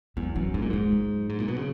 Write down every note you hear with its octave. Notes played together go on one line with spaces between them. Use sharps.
E2 F#3
F#2 E3
G#2 F#3
A#2
G#2 G#3
F#3
G#2
A#2
B2
C#3